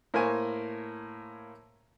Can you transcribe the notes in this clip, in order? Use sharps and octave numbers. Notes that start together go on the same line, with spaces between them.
A2 A#3 A#4 C5 G#5 C#6